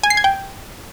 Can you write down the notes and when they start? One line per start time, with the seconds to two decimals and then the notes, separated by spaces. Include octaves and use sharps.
0.03 G#5
0.10 C7
0.17 G#6
0.24 G5